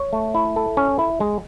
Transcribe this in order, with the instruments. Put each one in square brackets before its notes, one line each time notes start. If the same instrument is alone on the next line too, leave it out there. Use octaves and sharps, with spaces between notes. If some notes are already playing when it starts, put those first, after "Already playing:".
Already playing: [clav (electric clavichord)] C#5
A3
E4
A4
C#4
E4
G#3